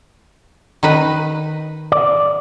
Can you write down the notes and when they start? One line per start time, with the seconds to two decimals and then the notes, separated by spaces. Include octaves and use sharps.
0.83 D#3 D#4 B4
1.92 D5